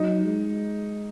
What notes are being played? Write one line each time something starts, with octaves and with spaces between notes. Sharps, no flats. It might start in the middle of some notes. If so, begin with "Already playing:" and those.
Already playing: F#3 D#4
G#3